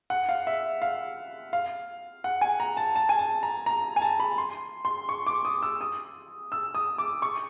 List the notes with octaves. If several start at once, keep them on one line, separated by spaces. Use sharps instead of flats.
F#5
F5
E5
F5
F5
F#5
G#5
A#5
A5
A5
G#5
A5
A#5
A#5
G#5
A5
B5
C6
C6
C#6
D6
D#6
E6
D#6
E6
D#6
D6
C#6